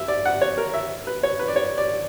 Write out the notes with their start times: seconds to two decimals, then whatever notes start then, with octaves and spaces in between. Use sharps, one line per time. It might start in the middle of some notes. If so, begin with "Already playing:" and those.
Already playing: E5
0.08 D5
0.25 F#5
0.41 C#5
0.58 A#4
0.74 E5
1.07 B4
1.23 C#5
1.39 B4
1.48 D5
1.56 C#5
1.78 D5